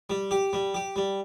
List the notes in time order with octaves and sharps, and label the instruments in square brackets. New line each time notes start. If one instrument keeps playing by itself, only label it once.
[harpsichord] G3
G4
G3
G4
G3